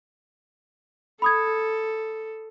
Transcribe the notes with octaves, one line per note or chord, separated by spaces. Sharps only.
A4 B5 D#6 G#6